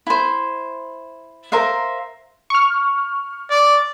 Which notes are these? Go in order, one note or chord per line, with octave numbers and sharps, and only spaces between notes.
E4 C5
A#4 C5 E5 F5
C#6 F6
D5